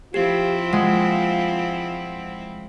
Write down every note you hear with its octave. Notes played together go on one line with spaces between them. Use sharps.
F3 C4 E4 F4 G4
G#3 F#5